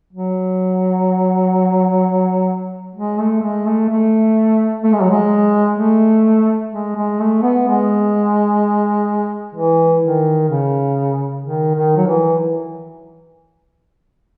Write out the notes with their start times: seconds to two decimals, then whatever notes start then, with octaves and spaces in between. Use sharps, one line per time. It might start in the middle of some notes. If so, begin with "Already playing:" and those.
0.13 F#3
2.95 G#3
3.19 A3
3.42 G#3
3.66 A3
3.89 A3
4.83 A3
4.93 G#3
5.01 F#3
5.10 G#3
5.78 A3
6.72 G#3
6.96 G#3
7.20 A3
7.43 B3
7.67 G#3
9.55 E3
10.02 D#3
10.49 C#3
11.44 D#3
11.75 D#3
11.96 F#3
12.07 E3